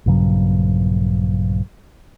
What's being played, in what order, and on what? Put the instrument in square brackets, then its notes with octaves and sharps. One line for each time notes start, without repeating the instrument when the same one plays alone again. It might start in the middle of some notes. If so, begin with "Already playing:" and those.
[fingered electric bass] A#1 G2 C#3 F#3